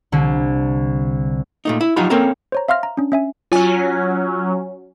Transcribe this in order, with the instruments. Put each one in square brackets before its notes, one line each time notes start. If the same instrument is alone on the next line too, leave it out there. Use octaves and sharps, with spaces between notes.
[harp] C2 D3
[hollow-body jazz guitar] A#2 A3 D#4
E4
F3 F#3 D#4 F4 G4 B5
A#3 C4 C#4 A4 A#4
[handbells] C5 C#5 A#5
E5 F5 C6 F6 A#6
A#5
C#4 D4
C#4 E5 G#5
[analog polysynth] F#3 C#4 [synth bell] F4 G#5